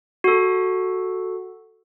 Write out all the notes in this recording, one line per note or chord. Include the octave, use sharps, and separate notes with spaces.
F#4 A4